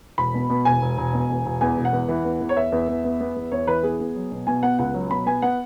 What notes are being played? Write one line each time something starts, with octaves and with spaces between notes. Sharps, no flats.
E1 B5
B2
B2
E1 G#5
E1
E1
B2
E1
E1
E2 G#5
E1
F#5
E2
E3
E2
E2
C#5
E2 E5
E2
E2
B3
B3
E2
E2 C#5
E3 B4
B3 G#4
B3
F#3
B2
B2 G#5
B3 F#5
C#2 F#5
F#3
B2 B5
B3 G#5
B3 F#5